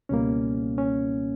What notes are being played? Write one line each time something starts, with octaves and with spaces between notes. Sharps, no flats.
C#2 B2 G3 A#3 C#4
C#4